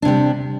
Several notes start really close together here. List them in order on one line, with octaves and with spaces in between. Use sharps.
D4 C3 G3